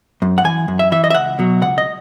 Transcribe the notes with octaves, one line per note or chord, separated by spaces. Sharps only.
F#2
F#5
E3 G#5
F#2
E5
E3 E5
D#5
E5
C#2 F#5
B2 F#3
C#2 F#5
D#5